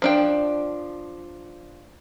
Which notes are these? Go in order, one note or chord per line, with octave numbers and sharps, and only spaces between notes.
F3 D4 G5